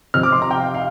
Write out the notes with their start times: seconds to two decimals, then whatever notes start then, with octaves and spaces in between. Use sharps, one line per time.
0.14 C3 F3 C4 F6
0.23 D6
0.32 C6
0.42 A#5
0.51 G5
0.60 F5
0.74 F5